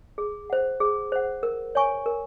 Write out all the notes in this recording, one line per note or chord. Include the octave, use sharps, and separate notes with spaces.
G#4
C5 F#5
G#4
C5 F#5
A#4
C#5 G#5 C#6
A#4